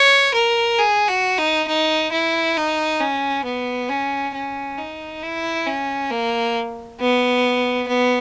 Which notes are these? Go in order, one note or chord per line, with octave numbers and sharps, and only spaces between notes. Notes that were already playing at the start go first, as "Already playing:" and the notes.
Already playing: C#5
A#4
G#4
F#4
D#4
D#4
E4
D#4
C#4
B3
C#4
C#4
D#4
E4
C#4
A#3
B3
B3